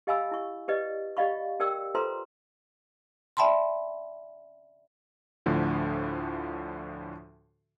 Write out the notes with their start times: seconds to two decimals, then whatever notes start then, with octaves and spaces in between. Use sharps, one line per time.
0.07 G4 D#5 F5 G#5 B5 E6
0.31 E4 C#6
0.68 G4 B4 D5 D#5
1.17 G4 D5 D#5 F5 B5 C#6
1.60 G4 A#4 D5 G5 E6
1.95 F4 A4 B4 C5 A#5 C6
3.37 D5 E5 G5 A5 B5 C6
5.46 D2 A2 D3 F3